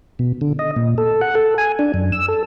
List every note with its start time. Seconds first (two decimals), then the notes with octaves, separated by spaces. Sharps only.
0.19 B2
0.41 D3
0.59 D#5
0.76 A#2
0.98 A4
1.21 F#5
1.35 A4
1.58 G#5
1.79 D4
1.94 F#2
2.12 E6
2.28 A4